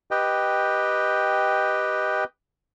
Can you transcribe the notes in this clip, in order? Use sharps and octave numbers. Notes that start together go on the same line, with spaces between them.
G4 B4 D#5 G5